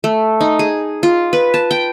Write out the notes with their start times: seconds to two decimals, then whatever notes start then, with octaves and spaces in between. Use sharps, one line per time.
0.04 A3
0.41 D#4
0.59 G#4
1.03 F4
1.33 B4
1.54 A5
1.71 G5